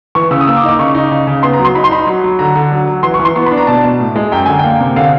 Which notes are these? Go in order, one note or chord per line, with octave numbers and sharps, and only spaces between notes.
E3 C#6
C#3 E6
D#6
A#3 E6
D6
D#4
D6
C#3 C#6
D#4
C#3
C#3
B3 C6
A#5
F#3
C6
D#4 B5
C6
D#4 B5
F#3
F#3
D3 A#5
D3
F#3
F#3
E3 C6
C#6
E3
C6
B3 C#6
B5
D4
A#5
B2 A5
B2
A2
G#3
F#2 G5
D3 G#5
G5
A#3
C3
D3 F5